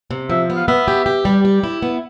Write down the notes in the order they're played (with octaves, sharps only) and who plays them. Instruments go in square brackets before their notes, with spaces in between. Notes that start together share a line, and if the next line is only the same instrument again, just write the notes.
[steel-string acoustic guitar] C3
[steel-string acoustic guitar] F3 [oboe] E5
[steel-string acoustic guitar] B3
[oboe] F5
[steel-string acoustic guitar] B3 [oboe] E5
[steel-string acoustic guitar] G4
G4
G3
G4
E4
B3